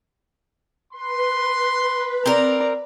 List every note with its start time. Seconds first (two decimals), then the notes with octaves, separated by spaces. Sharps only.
0.92 B4 C6
2.26 C4 A#4 D5 A#5